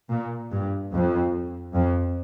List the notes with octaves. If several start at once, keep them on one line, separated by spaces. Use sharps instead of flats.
A#2
G2
F2
F2